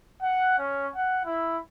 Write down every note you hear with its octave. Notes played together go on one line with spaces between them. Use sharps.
F#5
C#4
F#5
E4